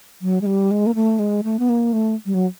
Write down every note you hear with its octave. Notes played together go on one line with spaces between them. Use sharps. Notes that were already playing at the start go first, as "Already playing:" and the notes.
F#3
G#3
G3
G#3
A#3
A3
G#3
A3
B3
A#3
A3
G3
F#3